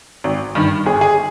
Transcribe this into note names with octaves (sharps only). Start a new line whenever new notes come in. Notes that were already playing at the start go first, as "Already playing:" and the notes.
G#1
G2 D#3
G1 G#4
G#4